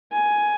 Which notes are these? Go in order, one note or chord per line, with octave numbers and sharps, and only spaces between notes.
G#5